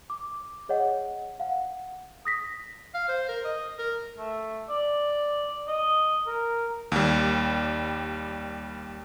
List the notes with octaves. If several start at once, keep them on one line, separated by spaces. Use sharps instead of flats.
D6
G#4 C#5 D#5 F#5
F5 F#5
D#6 A#6 B6
F5
C5
A#4
D#5
A#4
A3
D5
D#5
A#4
D#2 G3